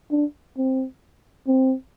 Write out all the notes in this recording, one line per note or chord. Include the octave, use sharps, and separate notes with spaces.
D4
C4
C4